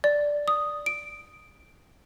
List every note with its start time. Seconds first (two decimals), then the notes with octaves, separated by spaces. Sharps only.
0.04 D5
0.48 D#6
0.86 D7